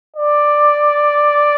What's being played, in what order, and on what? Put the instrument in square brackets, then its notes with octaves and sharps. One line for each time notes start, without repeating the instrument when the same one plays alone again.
[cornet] D5